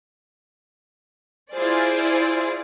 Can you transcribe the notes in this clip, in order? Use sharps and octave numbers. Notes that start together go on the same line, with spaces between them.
E4 F4 G#4 C5 D5